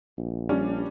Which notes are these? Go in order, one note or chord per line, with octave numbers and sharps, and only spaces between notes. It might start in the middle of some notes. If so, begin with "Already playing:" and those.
A#1
G3 C#4 D4